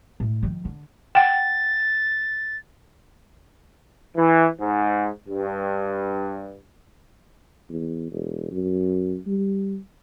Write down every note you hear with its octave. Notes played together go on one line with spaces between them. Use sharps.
A2
D#3 F3
D3
F#5 G5 A6
E3
G#2
G2
E2
E1
F#2
G3